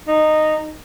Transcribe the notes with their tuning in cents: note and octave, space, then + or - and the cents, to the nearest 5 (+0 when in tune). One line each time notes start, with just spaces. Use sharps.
D#4 -10